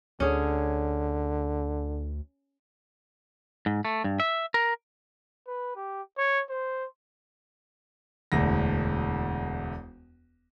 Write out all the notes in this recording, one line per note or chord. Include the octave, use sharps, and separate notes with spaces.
D2 D3 C#4 G#4
G#2
A3
G2
E5
A#4
B4
G4
C#5
C5
E1 D2 A#6